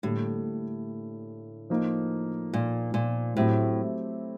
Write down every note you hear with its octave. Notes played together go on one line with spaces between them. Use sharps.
A2 D3 G3 A#3
F3 A#3 D#4
A#2
A#2
A2 F#3 A3 C4 E4 G4